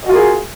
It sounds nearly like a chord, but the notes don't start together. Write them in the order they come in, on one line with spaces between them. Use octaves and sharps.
D#5 F#4 F4 A#4 G#4